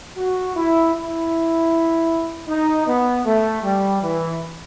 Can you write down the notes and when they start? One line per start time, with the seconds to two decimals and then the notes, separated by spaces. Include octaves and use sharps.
0.17 F#4
0.56 E4
0.95 E4
2.48 D#4
2.87 B3
3.25 A3
3.63 G3
4.02 E3